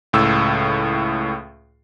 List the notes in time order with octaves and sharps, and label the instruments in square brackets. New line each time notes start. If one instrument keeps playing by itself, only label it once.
[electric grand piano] C#2 A2 E6